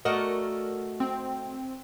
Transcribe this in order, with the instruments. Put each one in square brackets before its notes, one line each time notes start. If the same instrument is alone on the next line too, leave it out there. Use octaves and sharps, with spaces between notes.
[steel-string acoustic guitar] A3 F#4 D#5 [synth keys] A#4 D5
[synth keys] C4